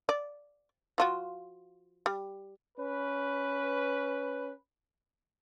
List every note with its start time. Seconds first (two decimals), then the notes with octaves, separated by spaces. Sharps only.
0.09 D5
0.98 F3 F4 F#4
2.06 G3
2.78 C#4 B4